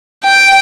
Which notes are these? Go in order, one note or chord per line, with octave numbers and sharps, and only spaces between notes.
G5